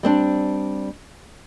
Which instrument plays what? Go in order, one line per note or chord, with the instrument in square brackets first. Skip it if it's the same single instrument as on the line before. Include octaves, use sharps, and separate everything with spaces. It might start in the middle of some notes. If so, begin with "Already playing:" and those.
[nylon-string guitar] G3 C4 D4